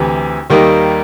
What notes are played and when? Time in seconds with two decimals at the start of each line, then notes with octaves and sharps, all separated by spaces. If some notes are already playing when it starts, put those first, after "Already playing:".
Already playing: D2 C3 E3
0.50 D#2 D#3 G3 A#3 D#4